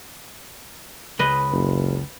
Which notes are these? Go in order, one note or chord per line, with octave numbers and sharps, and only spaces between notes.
C#2 B4 D#5
F#1